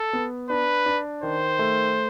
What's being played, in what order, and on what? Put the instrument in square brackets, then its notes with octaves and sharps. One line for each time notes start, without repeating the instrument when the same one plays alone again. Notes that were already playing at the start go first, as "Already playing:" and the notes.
Already playing: [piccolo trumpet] A4
[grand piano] B3
[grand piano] D4 [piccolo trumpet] B4
[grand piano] D4
[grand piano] D#3 [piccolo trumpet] C5
[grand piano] A3